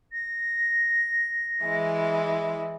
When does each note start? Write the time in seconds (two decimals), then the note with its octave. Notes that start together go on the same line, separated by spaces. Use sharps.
0.13 A#6
1.62 E3 G#3 E4